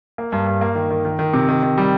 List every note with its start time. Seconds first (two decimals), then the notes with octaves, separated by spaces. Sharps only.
0.18 A#3
0.32 G2
0.47 G2
0.61 A#3
0.75 D#3
0.91 D#3
1.05 D#3
1.19 D#3
1.33 C3
1.49 D#3
1.63 D#3
1.78 G3